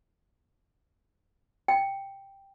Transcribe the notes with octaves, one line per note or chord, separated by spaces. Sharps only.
G5